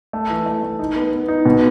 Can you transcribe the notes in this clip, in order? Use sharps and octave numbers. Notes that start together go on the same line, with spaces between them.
A3
E3
A3
A3
D#4
B3
B3
D#4
B2